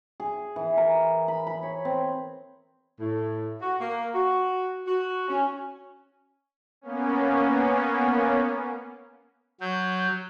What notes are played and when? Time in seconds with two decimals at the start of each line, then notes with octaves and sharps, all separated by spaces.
0.20 G#4
0.56 E3
0.77 A#4
1.28 B5
1.47 B5
1.63 C#5
1.85 C4
3.00 A2
3.61 F#4
3.80 A#3
4.15 F#4
4.87 F#4
5.28 C#4
6.81 A#3 B3 C#4
9.61 F#3 G6